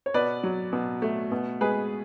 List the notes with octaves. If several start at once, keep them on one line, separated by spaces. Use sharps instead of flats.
C#5
B2 B4 D5
F#3
B2
A3
B2
G#3 G#4 B4